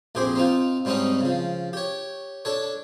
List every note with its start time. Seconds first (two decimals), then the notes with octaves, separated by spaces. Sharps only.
0.15 A#1 F2 G4 G#4 C5 D6
0.35 C4 D#4 F4
0.85 G#2 G3 C4 C#4 D#4 D#5
1.21 C#3 F3
1.73 G4 C#5
2.45 D4 A4 C#5